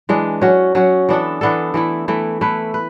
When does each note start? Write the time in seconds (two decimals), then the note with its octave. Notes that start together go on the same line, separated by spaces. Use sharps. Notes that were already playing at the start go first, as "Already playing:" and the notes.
0.09 E3 G#3 D4
0.41 F#3 C#4 F#4
0.75 F#3 C#4 F#4
1.09 E3 B3 D4 A4
1.41 E3 B3 D4 A4
1.74 E3 A3 E4
2.08 E3 A3 E4
2.41 A3 E4 B4
2.74 B4